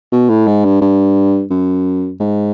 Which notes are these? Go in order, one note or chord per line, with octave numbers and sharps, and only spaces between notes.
B2
A2
G#2
G2
G2
F#2
G#2